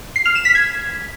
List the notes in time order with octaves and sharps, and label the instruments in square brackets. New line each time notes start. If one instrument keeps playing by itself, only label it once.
[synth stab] C7
F6
E7
B6
G#6